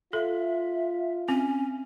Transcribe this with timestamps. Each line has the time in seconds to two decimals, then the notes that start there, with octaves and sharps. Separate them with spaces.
0.13 F4 A4 E5
1.28 C4 C#4